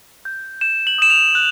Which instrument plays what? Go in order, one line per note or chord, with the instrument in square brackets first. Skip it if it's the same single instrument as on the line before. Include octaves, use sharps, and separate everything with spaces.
[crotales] G6
G6 E7
F#7
D#6 E7
F7
F#6